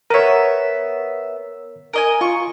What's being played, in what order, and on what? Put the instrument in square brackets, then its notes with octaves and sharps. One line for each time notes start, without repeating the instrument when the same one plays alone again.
[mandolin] B3 E5 [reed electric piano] A#4 C#5
[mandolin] A#4 D#5 G#5
[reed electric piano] F4 [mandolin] C#6